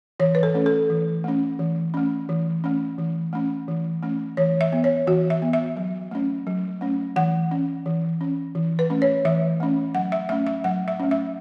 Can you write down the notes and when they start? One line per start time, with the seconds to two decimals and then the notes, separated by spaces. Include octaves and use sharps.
0.20 E3 C#5
0.35 B4
0.43 A4
0.54 A3 C#4
0.66 A4
0.90 E3
1.24 A3 C#4
1.59 E3
1.94 A3 C#4
2.29 E3
2.64 A3 C#4
2.98 E3
3.33 A3 C#4
3.68 E3
4.03 A3 C#4
4.37 E3 C#5
4.61 E5
4.72 B3
4.84 C#5
5.07 E3 F#4
5.30 E5
5.42 B3
5.53 E5
5.77 F#3
6.11 A3 C#4
6.47 F#3
6.81 A3 C#4
7.16 E3 F#5
7.51 C#4
7.86 E3
8.21 C#4
8.55 E3
8.79 B4
8.90 A3 C#4
9.02 C#5
9.25 E3 E5
9.60 A3 C#4
9.95 F#3 F#5
10.12 E5
10.29 A3 C#4 E5
10.47 E5
10.64 F#3 F#5
10.88 E5
11.00 A3 C#4
11.11 E5